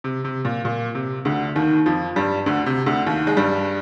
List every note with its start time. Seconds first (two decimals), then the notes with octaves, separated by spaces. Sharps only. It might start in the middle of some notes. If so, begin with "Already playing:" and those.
0.04 C3
0.24 C3
0.45 A#2
0.65 A#2
0.95 C3
1.25 D2 D3
1.56 D#2 D#3
1.86 F2 F3
2.16 G2 G3
2.46 D2 D3
2.66 C3
2.86 D2 D3
3.06 D#2 D#3
3.27 G#3
3.37 G2 G3